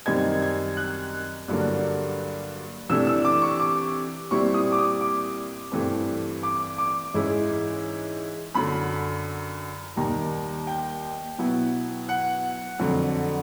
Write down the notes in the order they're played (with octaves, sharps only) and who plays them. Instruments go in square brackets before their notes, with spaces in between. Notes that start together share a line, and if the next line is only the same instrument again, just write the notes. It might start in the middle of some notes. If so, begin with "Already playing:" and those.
[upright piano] F#2 D#3 G3 C4 D#4 G#6
G#6
F#6
G2 D3 F#3 A#3 D4
C3 E3 A3 D4 E6
E6
D6
C#6
D6
A#2 G3 C4 E4 C#6
D#6
D6
D#6
D6
G2 E3 A3 C4
D6
D6
G#2 E3 G#3 C#4 E4
F#2 D3 F#3 B5
D#2 D#3 G3 A#5
G5
B2 F#3 B3 E4
F#5
F2 D3 F#3